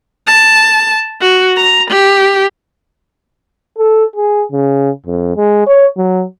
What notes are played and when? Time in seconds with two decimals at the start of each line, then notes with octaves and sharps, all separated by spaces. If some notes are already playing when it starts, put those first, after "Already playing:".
0.27 A5
1.21 F#4
1.56 A#5
1.90 G4
3.79 A4
4.16 G#4
4.52 C#3
5.07 F2
5.37 G#3
5.67 C#5
5.98 F#3